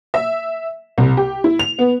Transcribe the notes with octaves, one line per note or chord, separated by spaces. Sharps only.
E5
C2
G4
E4
F7
B3